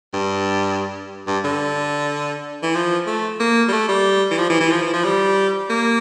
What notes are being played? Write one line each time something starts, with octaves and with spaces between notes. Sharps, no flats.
G2
G2
D3
E3
F3
A3
A#3
G3
A3
G3
E3
F3
E3
E3
F3
E3
F3
G3
A#3